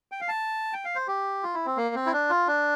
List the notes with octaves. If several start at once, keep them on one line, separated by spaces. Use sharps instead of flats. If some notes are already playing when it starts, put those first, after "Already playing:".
G5
F5
A5
G5
F5
C5
G4
F4
E4
C4
A#3
C4
E4
D4
F4
D4